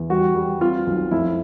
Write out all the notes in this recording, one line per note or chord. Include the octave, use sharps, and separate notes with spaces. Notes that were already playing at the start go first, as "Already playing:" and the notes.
Already playing: E2
G3 F#4
G3
C4 F4
B1
F2 E4